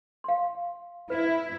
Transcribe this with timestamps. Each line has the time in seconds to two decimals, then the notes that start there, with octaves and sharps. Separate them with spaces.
0.24 F5 C6
1.10 E4 B4 E5